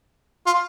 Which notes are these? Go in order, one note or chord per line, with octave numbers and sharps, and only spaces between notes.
F4